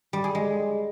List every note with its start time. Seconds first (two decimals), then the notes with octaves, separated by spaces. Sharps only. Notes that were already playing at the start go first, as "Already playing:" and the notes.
0.13 G3
0.24 G#4
0.35 G#3